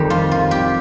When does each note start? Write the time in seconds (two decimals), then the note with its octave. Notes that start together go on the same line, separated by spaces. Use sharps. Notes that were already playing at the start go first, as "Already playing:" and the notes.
Already playing: F2 D#3 G3 G4
0.10 F4
0.31 F4
0.51 G4